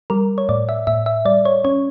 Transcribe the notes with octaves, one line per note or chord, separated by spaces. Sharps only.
G3 A#4
C#5
A2 D5
E5
A2 E5
E5
G3 D5
C#5
C#4 C#5